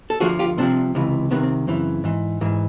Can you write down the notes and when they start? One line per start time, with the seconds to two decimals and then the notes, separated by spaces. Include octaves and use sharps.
0.10 A4
0.20 D2 D3 F3 F#4 G#4
0.39 F4 G4
0.57 C2 C3 F3 C4 D4
0.95 C#2 C3 E3
1.31 C2 C3 D#3 B3 C#4
1.43 C4
1.67 F#2 C#3 E3 C4
2.04 G#2 E3
2.41 G#2 E3